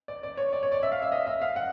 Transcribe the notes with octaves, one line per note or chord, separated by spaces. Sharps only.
D5
D5
C#5
D5
C#5
D5
E5
F5
E5
D#5
E5
F5
F#5